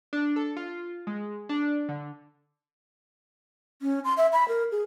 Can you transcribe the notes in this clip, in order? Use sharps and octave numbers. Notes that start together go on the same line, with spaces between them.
D4
A4
F4
G#3
D4
D3
C#4
C6
E5
B5
A#4
G#4